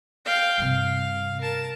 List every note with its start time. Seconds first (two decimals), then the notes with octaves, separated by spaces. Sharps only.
0.25 F5 G5
0.58 G2 C3 F5
1.41 A#4 A5